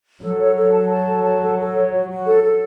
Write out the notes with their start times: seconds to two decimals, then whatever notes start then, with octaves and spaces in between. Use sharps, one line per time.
0.21 F#3 A4
0.39 C#5
0.55 A4
0.72 A5
0.90 A5
1.07 A4
1.24 A5
1.41 A4
1.58 A4
1.75 C#5
1.93 F#4
2.10 F#4
2.27 A4
2.43 A4